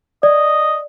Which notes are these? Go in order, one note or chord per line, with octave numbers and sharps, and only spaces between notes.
D5 D#5